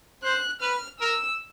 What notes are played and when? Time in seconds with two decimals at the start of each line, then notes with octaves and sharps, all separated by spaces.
0.23 C5 F#6
0.62 B4 F6
1.00 A#4 E6